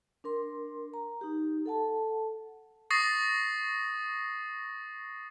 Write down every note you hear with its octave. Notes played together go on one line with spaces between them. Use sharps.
D4 A#4 C6
A#5
D#4 G4
A4 F#5 A5
C#6 D#6 A6 A#6 C7